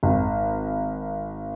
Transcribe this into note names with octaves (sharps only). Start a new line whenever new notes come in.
G#1